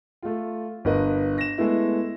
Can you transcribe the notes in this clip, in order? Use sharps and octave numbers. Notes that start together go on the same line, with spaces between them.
A3 F4
G1 A#4 B4 D#5
A#6 E7
G#3 A3 B3 E4